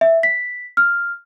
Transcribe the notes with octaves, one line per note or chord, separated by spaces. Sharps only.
E5
B6
F6